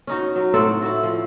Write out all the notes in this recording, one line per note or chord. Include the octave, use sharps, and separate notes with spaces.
C#4 D#4 F#4
F#3
A2 C4 A4 F#5
E4 F#4
F3